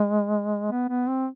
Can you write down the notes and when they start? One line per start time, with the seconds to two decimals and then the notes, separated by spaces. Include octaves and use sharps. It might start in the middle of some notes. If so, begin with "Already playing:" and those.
Already playing: G#3
0.71 B3
0.89 B3
1.08 C4